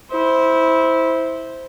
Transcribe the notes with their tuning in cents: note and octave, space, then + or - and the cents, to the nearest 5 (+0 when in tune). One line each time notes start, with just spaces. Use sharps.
E4 -15 C5 +0